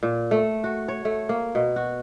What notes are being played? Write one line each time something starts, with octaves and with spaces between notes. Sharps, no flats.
A#2
A3
F#4
C#5
A3
A#3
B2
F#4